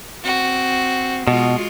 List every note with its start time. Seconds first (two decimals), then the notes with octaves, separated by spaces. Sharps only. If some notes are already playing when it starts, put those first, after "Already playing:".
0.24 C4 F#4
1.27 B2 G#3 F4 F#4